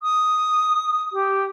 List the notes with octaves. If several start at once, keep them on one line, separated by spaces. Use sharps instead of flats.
D#6
G4